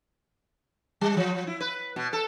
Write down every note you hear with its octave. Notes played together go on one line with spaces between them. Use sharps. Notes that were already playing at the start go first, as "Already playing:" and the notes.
G3
F3
E4
B4
B2
A4